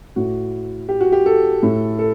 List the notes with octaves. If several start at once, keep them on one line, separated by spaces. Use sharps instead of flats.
A2 F#4
G4
F#4
G4
A4
A2
A4